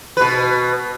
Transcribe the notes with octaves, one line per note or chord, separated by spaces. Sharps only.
B2 B4